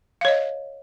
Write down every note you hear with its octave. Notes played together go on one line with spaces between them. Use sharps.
C#5 D#5 F5